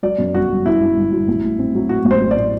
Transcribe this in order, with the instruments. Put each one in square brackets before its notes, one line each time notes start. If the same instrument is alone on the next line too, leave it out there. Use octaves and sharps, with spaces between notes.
[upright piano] F#3 [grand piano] D5
[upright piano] F#2
[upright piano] G1 [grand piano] F#4
[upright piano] G1
[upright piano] F#2 [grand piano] E4
[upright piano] G1
G1
F#3
A1
A2
C4
F#3
[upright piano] A2 [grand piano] F#4
[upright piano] A1
[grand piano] C5
[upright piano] F#3
[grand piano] D5
[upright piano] A2